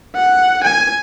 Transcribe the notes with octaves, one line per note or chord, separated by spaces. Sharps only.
F#5
G#5